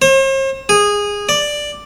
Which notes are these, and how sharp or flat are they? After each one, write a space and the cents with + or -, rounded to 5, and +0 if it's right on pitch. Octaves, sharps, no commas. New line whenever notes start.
C5 +45
G#4 -15
D5 +5